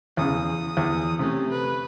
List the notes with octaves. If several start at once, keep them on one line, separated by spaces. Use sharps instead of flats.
E2 C#3 D#6
E2
C3 A3 C#4
B4